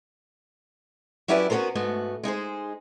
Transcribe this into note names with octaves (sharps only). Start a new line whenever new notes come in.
F#3 C#4 E4 G4 B4 D5
B3 C#4 F#4 A4 A#4 C5
G#2 A3 B3 F#4
G#3 D#4 G#4 C5